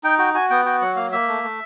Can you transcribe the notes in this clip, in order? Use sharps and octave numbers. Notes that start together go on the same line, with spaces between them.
D#4 G5
F#4 G5
F#4 G#5
B3 G5
F#4 G5
F#3 F#5
A#3 F5
A#3 E5
A3
A3